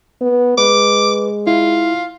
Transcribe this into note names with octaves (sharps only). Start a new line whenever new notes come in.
B3
G#3 B4 D6
E4 F4